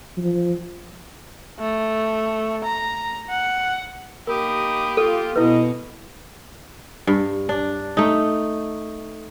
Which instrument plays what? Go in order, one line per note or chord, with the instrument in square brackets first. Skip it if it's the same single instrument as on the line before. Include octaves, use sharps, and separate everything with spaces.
[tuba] F3
[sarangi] A3
A#5
F#5
[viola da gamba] A#3 G4 [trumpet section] D#4 B5 D#6 [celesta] A#4
[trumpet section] F4 [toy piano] A4
[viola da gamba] B2 B3 [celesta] E4 B4 [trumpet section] D#5
[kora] G2
D4
A3 D#4